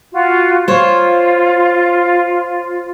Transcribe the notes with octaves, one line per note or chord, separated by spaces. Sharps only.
F4 F#4
F4 C5 C#5